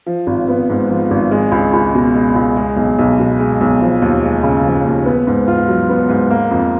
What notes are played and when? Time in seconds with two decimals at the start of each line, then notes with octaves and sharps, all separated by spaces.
0.06 F3
0.27 G#1
0.48 B3
0.70 G#2
0.90 F3
1.11 G#1
1.31 G#3
1.52 C#2
1.73 C#2
1.95 B2
2.14 G#3
2.36 C#2
2.56 G#3
2.77 B1
2.99 B1
3.19 B2
3.39 G#3
3.61 B1
3.81 F3
4.02 D#2
4.23 G#3
4.43 C#3
4.65 F3
4.85 D#2
5.06 B3
5.27 G#2
5.48 F4
5.68 F#3
5.89 B3
6.09 G#2
6.31 A#3
6.51 F2